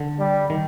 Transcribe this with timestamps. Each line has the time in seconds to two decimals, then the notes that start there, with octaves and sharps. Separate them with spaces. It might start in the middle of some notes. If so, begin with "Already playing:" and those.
Already playing: D3
0.19 G3
0.50 D#3